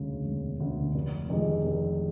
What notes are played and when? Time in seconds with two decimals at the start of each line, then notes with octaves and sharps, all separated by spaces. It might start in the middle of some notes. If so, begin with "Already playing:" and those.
Already playing: E1 D2 C#3
0.25 E1
0.60 D2 C#3
0.95 F1
1.29 F2 C3 D#3 G#3
1.64 F1